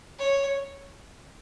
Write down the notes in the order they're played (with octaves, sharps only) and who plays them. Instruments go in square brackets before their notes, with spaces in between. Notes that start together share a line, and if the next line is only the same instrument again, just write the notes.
[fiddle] C#5